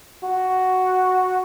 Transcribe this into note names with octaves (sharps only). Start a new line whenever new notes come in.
F#4